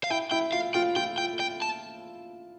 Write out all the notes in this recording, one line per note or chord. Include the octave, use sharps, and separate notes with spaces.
F5
E4 G5
E4 G5
F4 F5
F4 G5
F4 G5
G5
G5
A5